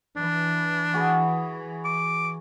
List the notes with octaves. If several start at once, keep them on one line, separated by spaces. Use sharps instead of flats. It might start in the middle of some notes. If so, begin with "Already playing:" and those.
E3 D4
F#4 G#4 B5
D6